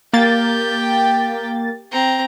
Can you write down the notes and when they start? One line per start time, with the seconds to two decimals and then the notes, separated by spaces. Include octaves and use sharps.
0.13 A#3 G4 G5 A6
1.92 C4 A#5